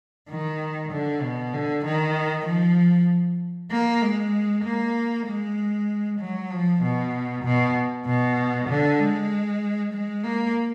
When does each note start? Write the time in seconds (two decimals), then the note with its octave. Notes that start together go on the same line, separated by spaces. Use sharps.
0.29 D#3
0.92 D3
1.22 B2
1.53 D3
1.85 D#3
2.46 F3
3.71 A#3
4.02 G#3
4.64 A#3
5.26 G#3
6.20 F#3
6.50 F3
6.82 B2
7.44 B2
8.06 B2
8.68 D3
8.99 G#3
9.93 G#3
10.24 A#3